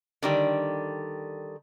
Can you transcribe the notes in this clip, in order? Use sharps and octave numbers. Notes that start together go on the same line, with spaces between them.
D3 D#3 G3